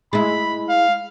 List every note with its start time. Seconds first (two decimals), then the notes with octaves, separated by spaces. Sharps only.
0.13 G#3 E4 B5
0.69 F5